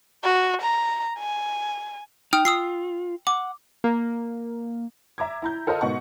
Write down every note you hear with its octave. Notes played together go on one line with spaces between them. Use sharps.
F#4
A#5
G#5
D#4 G5 D#6 F6
F4 D#6 E6 C7
F#5 D6
A#3
E5 A#5 D6 G#6
E4 A#5 G6
F4 A4 A#4 C5 D#5
G#2 B2 F#5 C#6